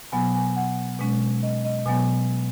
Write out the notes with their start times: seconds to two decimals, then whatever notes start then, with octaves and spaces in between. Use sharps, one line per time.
0.12 B2 F#3 B3 G#5
0.34 G#5
0.56 F#5
0.99 B2 G#3 C#4
1.43 D#5
1.65 D#5
1.86 B2 F#3 B3 G#5